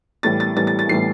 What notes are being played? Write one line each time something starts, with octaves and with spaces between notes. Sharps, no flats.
A2 E3 G3 A6
A6
A2 E3 G3 A6
A6
A6
A2 E3 G3 C7